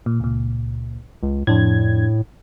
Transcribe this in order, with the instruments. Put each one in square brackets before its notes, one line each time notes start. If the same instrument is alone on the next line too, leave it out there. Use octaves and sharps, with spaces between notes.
[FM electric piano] A#2
C#2 A#2
[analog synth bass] C#2
[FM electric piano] F2 D4 G#6 [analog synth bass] A2